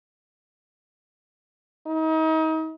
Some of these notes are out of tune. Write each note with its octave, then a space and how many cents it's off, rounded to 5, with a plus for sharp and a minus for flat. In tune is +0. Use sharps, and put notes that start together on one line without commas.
D#4 +35